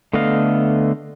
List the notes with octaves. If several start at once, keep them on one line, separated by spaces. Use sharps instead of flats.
D3 A3 B3 D#5 F5